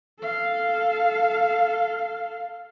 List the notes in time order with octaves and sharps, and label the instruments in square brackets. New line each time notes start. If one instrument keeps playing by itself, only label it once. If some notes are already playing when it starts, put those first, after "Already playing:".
[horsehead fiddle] A4 F5